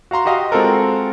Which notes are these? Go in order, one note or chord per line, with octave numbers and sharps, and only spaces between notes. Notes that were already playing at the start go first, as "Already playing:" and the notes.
F#4 F5 A#5 C6
F#4 G4 D#5 F5 C6
G#3 C4 F4 F#4 A4 A#4